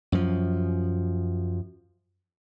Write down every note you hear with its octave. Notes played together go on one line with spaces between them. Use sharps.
F#2 F3